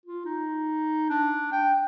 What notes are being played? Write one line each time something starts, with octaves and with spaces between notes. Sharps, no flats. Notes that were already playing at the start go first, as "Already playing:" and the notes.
F4
D#4
D4
G5